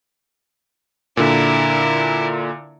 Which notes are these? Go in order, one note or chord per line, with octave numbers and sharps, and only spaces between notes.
A#2 D3 E4 A#4